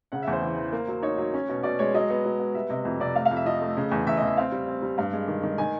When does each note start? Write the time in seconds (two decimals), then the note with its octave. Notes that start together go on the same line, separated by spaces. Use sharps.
0.12 C#3 F#5
0.22 E5
0.27 E2
0.33 C5
0.42 E3
0.57 E3
0.73 A#3
0.88 F#3
1.02 D#4 C#5
1.18 F#3
1.34 C#4
1.49 B2
1.63 B2 D5
1.79 G#3 C#5
1.94 F#3 D#5
2.10 B3
2.25 F#3
2.39 B3
2.55 G3 E5
2.70 C3 D#5
2.85 F2
3.00 C3 D5
3.15 A3 F5
3.25 F5
3.31 F2
3.36 E5
3.46 F3 D#5
3.62 A3
3.77 C#3
3.92 E2
4.07 E2 E5
4.17 E2 D#5
4.27 E5
4.37 C4 F5
4.52 G3
4.68 C4
4.82 G3
4.98 G2 F5
5.13 G#3
5.28 D#3
5.43 D#3
5.58 D#3 G#5